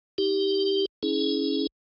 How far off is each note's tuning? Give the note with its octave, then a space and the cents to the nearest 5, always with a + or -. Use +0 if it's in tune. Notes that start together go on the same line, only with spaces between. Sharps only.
D#4 +30 G4 +0
C#4 +0 E4 -35 G#4 +20